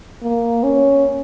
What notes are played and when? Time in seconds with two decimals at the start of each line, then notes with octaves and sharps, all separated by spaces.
0.22 A#3
0.63 C#4